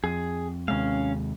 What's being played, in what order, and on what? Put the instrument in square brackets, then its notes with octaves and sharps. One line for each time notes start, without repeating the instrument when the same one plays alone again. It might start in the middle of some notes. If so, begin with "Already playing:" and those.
[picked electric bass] F2 [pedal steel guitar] G#4
[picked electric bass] D#2 C3 G#3 [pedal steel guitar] C#4 F5